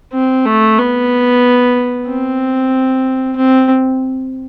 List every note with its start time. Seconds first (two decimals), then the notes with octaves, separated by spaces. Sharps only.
0.13 C4
0.45 A3
0.78 B3
2.07 C4
3.36 C4